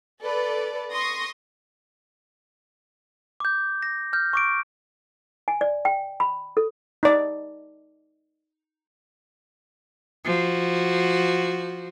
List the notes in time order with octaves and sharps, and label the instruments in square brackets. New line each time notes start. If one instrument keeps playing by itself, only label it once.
[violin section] A4 B4 D5
C6 C#6 D#6 A#6
[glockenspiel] D6 G6
A#6
F6 G6
C#6 D6 D7
[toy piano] G#5
D5
G5
B5
A4
[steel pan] D#4 D5
[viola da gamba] F3 F#4